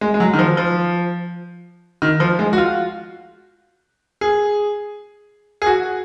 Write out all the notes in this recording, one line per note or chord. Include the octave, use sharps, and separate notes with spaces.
G#3
G#3
F#3
D#3
F3
F3
D#3
F3
G#3
F#4
F4
G#4
G#4
F#4